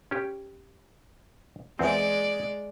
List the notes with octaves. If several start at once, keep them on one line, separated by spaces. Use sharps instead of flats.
C#4 G4
E2 G#3 C4 D5